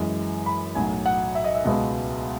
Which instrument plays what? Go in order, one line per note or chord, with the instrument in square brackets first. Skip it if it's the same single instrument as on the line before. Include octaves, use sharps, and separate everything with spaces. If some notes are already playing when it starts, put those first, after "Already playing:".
Already playing: [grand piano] F#2 E3 G#3
B5
B1 A2 F#3 G#5
F#5
E5
D#5
E5
C#2 B2 G#3 B3